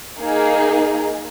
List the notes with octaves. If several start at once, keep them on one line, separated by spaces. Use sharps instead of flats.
A#3 D#4 G#4